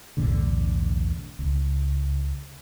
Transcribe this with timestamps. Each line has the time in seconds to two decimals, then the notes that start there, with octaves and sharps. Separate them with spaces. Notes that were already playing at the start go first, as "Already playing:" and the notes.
0.17 B1 E2 A2 D3
1.39 C#2